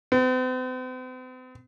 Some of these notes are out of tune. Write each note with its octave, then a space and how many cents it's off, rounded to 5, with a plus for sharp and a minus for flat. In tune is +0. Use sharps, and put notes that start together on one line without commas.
C4 -45